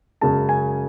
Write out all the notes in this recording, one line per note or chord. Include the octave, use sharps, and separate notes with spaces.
F#2 C#3 G#3 A5
G#5